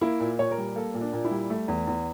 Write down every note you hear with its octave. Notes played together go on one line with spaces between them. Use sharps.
A#3 E4
A#2
A#2 C#5
A#4
G3
A#3 A4
A#2
D4
A#2
E4
G3
A3
E2
E2